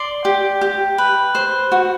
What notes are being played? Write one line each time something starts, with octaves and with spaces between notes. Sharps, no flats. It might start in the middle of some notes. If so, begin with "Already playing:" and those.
Already playing: D5 C6
G4
G4
B4
C5
F#4